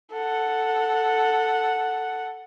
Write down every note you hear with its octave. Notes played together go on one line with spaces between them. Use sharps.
A4 F#5